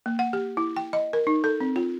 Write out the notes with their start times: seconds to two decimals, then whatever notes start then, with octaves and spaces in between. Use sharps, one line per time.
0.06 A#3
0.19 F#5
0.33 G4
0.57 E4
0.76 G5
0.93 D#5
1.13 A#4
1.27 D#4
1.44 A4
1.60 C4
1.76 F4